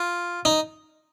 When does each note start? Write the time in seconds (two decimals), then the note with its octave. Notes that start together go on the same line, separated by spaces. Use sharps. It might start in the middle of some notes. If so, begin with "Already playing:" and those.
Already playing: F4
0.45 D#4